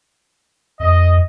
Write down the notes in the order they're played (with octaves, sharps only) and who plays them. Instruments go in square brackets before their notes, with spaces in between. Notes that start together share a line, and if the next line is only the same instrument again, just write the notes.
[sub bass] F2 [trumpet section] D#5